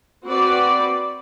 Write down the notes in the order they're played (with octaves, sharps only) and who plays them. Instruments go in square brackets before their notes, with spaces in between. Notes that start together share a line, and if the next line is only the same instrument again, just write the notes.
[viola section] C4 F#4 B4 D5